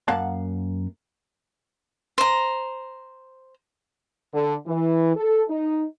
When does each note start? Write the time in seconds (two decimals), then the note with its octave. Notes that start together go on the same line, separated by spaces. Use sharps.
0.08 F#2 A#3 F5 F#5 A5
2.18 C5 A#5
4.34 D3
4.67 E3
5.15 A4
5.49 D#4